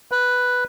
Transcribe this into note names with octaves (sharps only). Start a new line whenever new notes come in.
B4